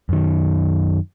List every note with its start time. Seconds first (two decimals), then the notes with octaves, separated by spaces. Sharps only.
0.09 F#2 D#3